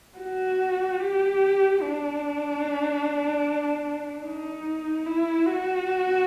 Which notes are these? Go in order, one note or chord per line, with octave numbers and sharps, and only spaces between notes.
F#4
G4
D4
D#4
E4
F#4